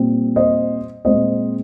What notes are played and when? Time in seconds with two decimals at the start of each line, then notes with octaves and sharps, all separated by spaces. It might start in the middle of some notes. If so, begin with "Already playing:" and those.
Already playing: A#2 G3 C4
0.36 C5 D#5
1.05 A#2 G#3 C4 C5 D#5